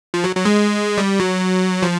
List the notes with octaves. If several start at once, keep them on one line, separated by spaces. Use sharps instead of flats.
F3
F#3
F#3
G#3
G3
F#3
F3